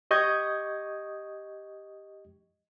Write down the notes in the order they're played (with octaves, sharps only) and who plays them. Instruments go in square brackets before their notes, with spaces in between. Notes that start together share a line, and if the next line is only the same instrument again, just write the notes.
[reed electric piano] G4 D#5 C#6 D#6 G6 G#6